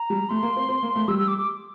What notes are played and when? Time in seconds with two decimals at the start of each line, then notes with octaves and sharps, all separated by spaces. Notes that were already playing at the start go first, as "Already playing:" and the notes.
Already playing: A#5
0.10 G3
0.29 A3 C6
0.43 A#3
0.56 C4
0.69 C4
0.83 A#3
0.96 A3
1.08 G3 E6
1.18 E6
1.28 D6
1.38 D6